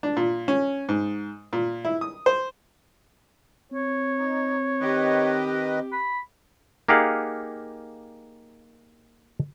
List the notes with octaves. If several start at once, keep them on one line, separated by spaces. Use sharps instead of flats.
D4
A#2
C#4
G#2
A#2
E4
D#6
C5
C4 C#5
D#4
D#3 G4 B4 D#5
B5
A#3 D#4 G4 G#4 F5 F#5